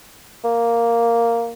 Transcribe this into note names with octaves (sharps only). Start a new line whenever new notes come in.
A#3